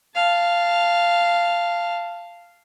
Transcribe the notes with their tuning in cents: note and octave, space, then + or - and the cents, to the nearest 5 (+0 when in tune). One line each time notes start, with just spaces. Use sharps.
F5 -10 A5 +0